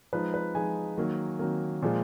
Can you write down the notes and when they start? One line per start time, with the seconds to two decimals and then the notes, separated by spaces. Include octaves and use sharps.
0.13 F3 G#3 D#4 B4
0.34 B4
0.55 F3 G#3 D#4 G#5
0.97 D#3 F#3 A#3
1.39 D#3 F#3 A#3
1.82 A#2 F3 G#3